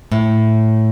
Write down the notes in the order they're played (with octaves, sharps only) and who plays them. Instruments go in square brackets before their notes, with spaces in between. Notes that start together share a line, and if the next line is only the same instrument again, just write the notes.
[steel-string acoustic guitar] A2